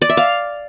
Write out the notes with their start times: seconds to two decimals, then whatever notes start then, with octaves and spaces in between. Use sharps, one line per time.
0.02 D5
0.09 E5
0.17 F5